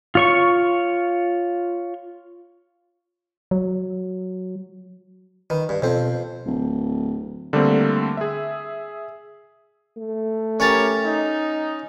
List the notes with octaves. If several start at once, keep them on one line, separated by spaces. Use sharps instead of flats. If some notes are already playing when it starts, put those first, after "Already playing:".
F4 C#5 C#6
F#3
D#3 B4
G2
F2 B2 C4 A4
D1
D3 G3 A3 A#3 C4
G#4 E5
A3
C#4 G4 A#4 C#5 A5
D#4